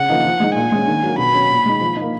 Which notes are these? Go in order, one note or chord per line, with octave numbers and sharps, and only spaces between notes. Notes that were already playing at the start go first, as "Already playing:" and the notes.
Already playing: C#3 F#5
F3 A#3 D#4
F3
G#3 D#4
A#2 G#5
G#3 C#4
D#3
F#3 A#3
B2 B5
F#3 C#4
A#2
G#3 D#4
F3
D#4
A#3